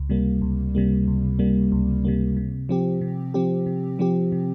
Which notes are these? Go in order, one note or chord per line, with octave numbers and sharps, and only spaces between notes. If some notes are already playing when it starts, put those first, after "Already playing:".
Already playing: C#2
C3 G3 A#3
C#2
C3 G3 A#3
C#2
C3 G3 A#3
C#2
C3 G3 A#3
C3
F3 C4 G4
C3
F3 C4 G4
C3
F3 C4 G4
C3